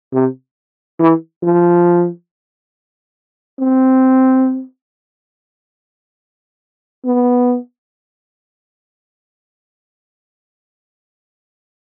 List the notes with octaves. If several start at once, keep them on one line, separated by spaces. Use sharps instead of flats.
C3
E3
F3
C4
B3